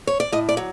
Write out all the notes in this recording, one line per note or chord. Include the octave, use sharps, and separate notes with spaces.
C#5
D5
A2 D#5
D5
F#3